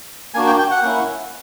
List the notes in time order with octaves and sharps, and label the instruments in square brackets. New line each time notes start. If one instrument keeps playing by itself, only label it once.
[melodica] A#3 D4 F#4 G#5
G5
G5
F#5
A#3 C#4 E4